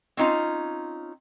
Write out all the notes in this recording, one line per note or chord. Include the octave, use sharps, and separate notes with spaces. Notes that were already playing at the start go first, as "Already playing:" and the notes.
C4 C#4 D#4 F4